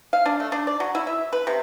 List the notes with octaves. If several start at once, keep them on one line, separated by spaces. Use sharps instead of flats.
F5
D4
A3
D4
D5
F#3
E4
E5
B4
C3